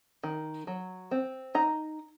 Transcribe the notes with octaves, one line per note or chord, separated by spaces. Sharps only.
D#3
F#3
C4
D#4 A#5